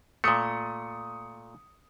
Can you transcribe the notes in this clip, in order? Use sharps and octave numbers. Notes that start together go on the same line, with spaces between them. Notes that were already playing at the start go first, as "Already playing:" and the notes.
A#2 A3 D#6 C#7